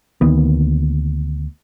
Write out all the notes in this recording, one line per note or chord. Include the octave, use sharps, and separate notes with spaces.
D2 D#3 A#3 B3